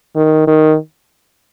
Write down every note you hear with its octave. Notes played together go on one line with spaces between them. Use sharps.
D#3
D#3